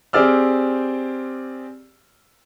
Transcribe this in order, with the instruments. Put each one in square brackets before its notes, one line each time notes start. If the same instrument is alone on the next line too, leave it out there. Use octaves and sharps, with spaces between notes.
[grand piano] C4 G4 G#4 D5 E6 F6